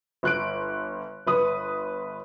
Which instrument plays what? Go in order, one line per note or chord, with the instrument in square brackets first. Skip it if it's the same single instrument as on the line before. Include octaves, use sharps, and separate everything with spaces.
[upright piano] G1 F#6 D7
G1 B4 D#6